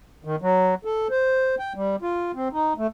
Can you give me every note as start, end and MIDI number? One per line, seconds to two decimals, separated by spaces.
0.24 0.36 51
0.42 0.74 54
0.85 1.08 69
1.10 1.55 72
1.59 1.73 79
1.75 1.96 55
2.02 2.32 65
2.35 2.48 60
2.53 2.73 63
2.78 2.87 57